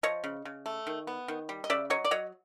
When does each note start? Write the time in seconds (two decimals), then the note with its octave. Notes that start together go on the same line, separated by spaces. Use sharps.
0.03 F3 C#5 D#5
0.24 C#3
0.45 C#3
0.66 A3
0.87 D#3
1.07 B3
1.28 D#3
1.49 G3
1.64 D#5
1.70 C#3 D5 E5
1.90 F#3 C#5 D#5
2.05 D5
2.11 F#3 C#5 D#5